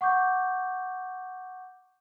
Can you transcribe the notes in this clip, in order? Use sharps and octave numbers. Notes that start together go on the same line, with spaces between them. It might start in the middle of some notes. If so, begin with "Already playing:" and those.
F#5 C#6 D6 G6